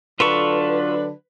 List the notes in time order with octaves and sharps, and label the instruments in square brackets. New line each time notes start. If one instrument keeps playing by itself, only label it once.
[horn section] D3 F#3 D4 [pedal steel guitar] F4 A4 C#6 [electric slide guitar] B4